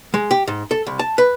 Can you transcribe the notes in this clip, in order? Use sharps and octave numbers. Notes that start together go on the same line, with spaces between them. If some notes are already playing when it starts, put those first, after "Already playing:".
G#3
G4
G#2
A4
C2
A5
B4